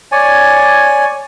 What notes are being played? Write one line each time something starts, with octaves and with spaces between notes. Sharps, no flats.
C#5 D5 G#5